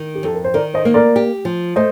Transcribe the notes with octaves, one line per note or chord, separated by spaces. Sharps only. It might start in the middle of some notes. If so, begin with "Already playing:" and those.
Already playing: D#3
G4
F2 A4
A#4
C5
D#3 A#4 D5
C5 D#5
A#3
A#4 D5
G4
F3
A3 C5 D#5